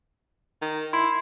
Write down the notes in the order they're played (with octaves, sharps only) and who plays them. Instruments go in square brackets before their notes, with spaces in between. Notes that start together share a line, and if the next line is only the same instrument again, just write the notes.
[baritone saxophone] D#3
[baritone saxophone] E4 [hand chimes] C6